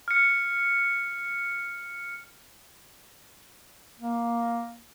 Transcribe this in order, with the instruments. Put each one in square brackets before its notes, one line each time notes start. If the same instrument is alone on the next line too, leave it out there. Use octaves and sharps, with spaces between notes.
[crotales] F6 C#7
[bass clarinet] A#3